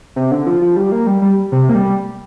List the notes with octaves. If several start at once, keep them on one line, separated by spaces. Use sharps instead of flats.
C3
D3
F3
F3
G3
A#3
G3
G3
C3
A#3
G3